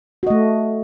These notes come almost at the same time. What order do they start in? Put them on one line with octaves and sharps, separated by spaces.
F#4 D#5 A3